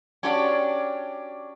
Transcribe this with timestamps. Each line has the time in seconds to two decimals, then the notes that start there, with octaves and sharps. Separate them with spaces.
0.23 C#4 D4 F#4 G4 C#5 D5